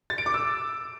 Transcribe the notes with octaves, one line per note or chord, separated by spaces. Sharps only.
A6
D7
D6
E6